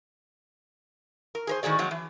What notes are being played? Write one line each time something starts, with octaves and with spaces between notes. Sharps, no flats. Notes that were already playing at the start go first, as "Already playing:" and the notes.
A#4
G#4 A#4 C5
A2 D#3 B3 F#4 G#4 D5
F3 F#3 G#3 C4
E3